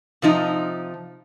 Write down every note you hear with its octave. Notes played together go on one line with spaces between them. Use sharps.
C3 F3 D#4